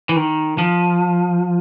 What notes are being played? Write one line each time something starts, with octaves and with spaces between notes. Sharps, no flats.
E3
D#3
F3